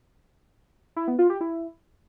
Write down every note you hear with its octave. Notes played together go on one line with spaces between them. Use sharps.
E4
B3
F4
G4
E4